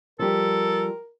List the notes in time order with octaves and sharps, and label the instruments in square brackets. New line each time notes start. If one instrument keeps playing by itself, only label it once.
[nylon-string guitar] F3 G3 G4 [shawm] A4 [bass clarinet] A#4